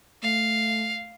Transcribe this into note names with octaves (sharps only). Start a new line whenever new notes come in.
A3 F5